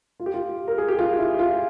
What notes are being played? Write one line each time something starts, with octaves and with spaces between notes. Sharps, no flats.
F4
G4
F4
A#4
G#4
G4
F4
E4
F4